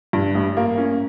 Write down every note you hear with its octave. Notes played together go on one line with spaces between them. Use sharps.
G2
A1
A#3
C#4